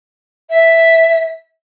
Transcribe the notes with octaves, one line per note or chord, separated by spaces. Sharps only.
E5